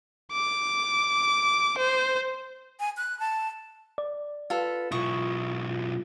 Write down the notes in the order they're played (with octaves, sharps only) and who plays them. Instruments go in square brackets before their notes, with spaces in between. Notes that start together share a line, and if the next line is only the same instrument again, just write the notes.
[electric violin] D6
C5
[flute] G#5
F#6
A5
[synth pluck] D5
[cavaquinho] F4 A4 [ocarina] B4
[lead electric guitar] B1 E4 [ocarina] F4 [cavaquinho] C#6 D#6